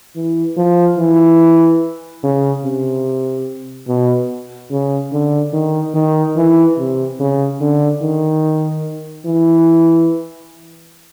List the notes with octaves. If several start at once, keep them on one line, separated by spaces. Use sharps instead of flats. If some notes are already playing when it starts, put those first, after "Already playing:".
E3
F3
E3
C#3
C3
B2
C#3
D3
D#3
D#3
E3
C3
C#3
D3
D#3
E3